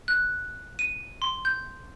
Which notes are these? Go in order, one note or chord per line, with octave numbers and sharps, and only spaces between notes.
F#6
D#7
C6
G6